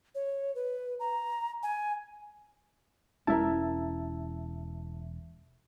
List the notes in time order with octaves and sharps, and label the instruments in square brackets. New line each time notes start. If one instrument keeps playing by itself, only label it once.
[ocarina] C#5
B4
A#5
G#5
[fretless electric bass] E1 G#3 C#4 [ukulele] E4 A#4 [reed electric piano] E5 A5